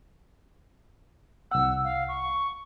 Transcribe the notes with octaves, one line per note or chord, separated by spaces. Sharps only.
C2 F#5 E6
F5
C#6